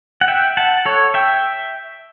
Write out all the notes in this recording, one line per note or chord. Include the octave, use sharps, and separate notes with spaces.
F#5
E5 G5
F#5 A5
A4 C#5
E5 G5